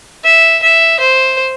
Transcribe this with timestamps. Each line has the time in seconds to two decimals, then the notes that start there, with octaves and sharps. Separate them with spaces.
0.24 E5
0.62 E5
1.00 C5